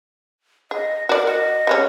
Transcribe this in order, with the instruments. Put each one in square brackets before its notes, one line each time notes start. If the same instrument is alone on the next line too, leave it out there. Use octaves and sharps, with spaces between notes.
[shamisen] G#4 [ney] D#5
[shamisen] F#4 D5 [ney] A#4
[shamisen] F#4 [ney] D#5
[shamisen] G3 G#3 C#4